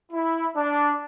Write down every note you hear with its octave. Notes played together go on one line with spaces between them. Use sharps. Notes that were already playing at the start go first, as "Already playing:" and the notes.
E4
D4